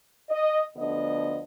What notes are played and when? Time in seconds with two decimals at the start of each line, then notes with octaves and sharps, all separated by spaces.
0.29 D#5
0.75 D2 D3 F3 B3 D4 D#5